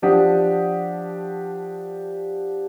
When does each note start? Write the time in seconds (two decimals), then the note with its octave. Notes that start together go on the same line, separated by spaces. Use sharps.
0.02 F3 D4 G4 F#5 D#6